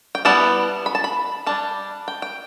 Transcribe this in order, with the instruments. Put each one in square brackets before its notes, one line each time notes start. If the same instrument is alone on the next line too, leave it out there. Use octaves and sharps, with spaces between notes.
[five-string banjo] G5
G3 B3 E4 A5
B5
A5
B5
G3 D4 A5
G5
G5